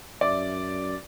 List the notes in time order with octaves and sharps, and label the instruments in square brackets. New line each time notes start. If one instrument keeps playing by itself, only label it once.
[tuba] F#2 [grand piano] D5 E5 D6